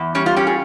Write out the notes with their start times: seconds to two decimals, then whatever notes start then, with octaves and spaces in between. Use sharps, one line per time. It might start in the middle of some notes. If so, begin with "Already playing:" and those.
Already playing: E2
0.15 G3 C#4
0.26 F4
0.36 C#4 G4
0.47 G#4